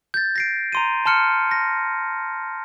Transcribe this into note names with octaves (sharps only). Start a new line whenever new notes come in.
G6 A6
A#6 C7 D7
A#5 C6 D#7
A5 C6 F6 C#7
A#6